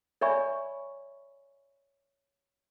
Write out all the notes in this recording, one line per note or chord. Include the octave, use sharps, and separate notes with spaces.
C#5 D5 E5 G#5 B5 C#6